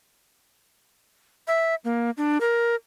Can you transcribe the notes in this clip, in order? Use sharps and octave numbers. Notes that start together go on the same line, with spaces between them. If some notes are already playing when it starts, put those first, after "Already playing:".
E5
A#3
D4
A#4